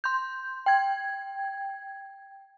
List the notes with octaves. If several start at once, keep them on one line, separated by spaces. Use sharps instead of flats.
C6 G6
G5 G#6